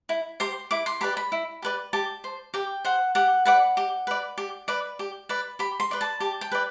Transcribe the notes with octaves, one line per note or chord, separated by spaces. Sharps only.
E4
G4 C5 C6
E4 D6
C6
G4 B4 D5 B5
B5
E4
G4 B4 D5
G4 A5
C5
G4 G5
C5 F#5
G4 F#5
B4 D5 F#5
G4
B4 D5
G4
B4 D5
G4
B4 D5
G4 B5
C6
B4 D5
A5
G4 A5
G5
B4 D5